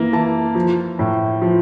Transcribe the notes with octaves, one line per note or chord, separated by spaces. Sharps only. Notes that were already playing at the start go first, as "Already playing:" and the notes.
Already playing: E3 A#3 A#5
E3 A5
F3
A2
F3